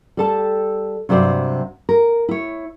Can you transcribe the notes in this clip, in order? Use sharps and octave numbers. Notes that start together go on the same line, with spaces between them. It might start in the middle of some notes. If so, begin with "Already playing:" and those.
G3 A4 A5
G2 C3 F#3 C5 D5
A#4
E4 C#5